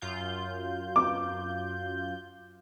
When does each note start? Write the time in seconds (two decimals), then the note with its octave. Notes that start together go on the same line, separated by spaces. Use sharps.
0.02 F#2 F4 G6
0.96 D6